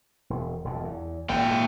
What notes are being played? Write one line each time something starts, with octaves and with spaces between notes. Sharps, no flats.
E1
E1 F2
E2
G#1 A#2 G5
G#3